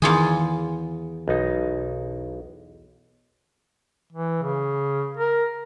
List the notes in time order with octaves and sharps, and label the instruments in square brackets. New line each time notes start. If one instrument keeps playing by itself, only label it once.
[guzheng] E2 F4 G#4 [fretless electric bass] D#3
[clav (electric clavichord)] B1 D#4
[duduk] E3
C#3
A#4